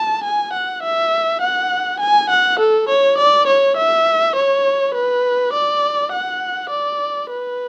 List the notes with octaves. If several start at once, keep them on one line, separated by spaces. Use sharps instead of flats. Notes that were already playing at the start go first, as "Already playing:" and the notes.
Already playing: A5
G#5
F#5
E5
F#5
G#5
F#5
A4
C#5
D5
C#5
E5
C#5
B4
D5
F#5
D5
B4